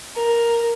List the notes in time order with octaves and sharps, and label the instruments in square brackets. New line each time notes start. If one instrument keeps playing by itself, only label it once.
[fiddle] A#4